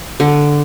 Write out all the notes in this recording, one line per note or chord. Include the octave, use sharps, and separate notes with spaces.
D3